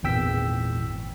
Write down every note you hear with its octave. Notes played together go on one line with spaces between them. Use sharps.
G#1 E2 A#2 G5 E6 B6